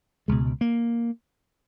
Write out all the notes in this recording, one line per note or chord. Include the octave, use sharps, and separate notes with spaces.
C#2 B2 G#3
A#3